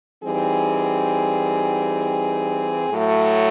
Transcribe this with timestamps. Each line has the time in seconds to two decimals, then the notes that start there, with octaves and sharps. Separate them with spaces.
0.22 E3 G3 C4 D#4 G#4
2.90 A2 F#3 A3